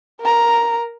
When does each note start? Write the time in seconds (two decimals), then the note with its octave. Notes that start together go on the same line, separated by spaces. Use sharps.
0.21 A#4 A#5